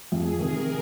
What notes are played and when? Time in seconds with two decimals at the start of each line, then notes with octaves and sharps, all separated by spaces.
0.11 F2 G#4
0.39 C3 D#3 A#4